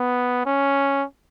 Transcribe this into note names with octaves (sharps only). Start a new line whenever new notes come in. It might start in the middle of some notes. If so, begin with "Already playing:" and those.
Already playing: B3
C#4